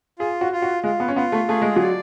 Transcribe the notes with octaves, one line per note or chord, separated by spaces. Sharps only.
F4 G#4
F#4
F4
F#4
G#3 F4
B3
C#4
B3 F4
A3
A3 G#4
G#3
F#3 D5